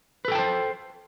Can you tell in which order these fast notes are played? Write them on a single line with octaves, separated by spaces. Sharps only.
B4 A4 G5 A5 C5